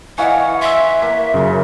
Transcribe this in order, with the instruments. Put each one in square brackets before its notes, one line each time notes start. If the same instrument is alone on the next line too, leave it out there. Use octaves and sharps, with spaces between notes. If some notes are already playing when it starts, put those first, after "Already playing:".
[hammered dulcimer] E3 B4 C#5 [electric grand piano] D#5 F5 G#5 [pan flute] F#5
[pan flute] E5 [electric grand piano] C6 E6
[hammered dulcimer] A#3 [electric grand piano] B6
[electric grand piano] F#2 C#3